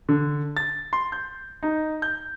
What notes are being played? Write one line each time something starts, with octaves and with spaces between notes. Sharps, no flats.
D3
A6
C6
G6
D#4
G6